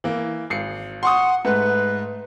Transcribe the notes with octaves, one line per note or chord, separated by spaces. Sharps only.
E3 A#3
G#1 C7 C#7
F#5 C6 C#6 D#6
G#2 A3 B4